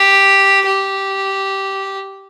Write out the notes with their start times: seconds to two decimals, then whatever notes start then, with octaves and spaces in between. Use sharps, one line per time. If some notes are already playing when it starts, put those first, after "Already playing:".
Already playing: G4
0.66 G4